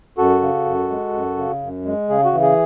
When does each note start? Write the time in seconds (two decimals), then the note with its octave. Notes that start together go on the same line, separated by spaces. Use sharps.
0.18 F#2 F#4 A4
0.42 C#3
0.65 F#2
0.90 G#3
1.14 F#2
1.37 C#3
1.62 F#2
1.85 G#3
2.09 C#3 G#4
2.25 F#4
2.33 E3
2.42 G#4